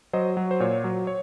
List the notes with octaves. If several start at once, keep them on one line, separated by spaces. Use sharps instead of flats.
F#3 C5 D#5
F#3
C5
A#2 C#5
F#3
C#5